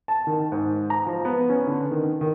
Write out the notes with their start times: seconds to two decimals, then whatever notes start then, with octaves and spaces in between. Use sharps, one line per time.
0.08 A5
0.27 D#3
0.52 G#2
0.90 A#5
1.06 F3
1.25 B3
1.49 C#4
1.67 D3
1.91 D#3
2.21 D#3